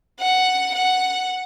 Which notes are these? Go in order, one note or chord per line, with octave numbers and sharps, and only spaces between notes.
F#5
F#5